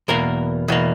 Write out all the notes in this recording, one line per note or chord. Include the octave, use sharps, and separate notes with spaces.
E2 B2 A#3 A#4
E2 B2 A#3